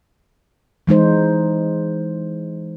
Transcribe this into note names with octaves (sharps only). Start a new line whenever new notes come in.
E3 G#3 D#4 C5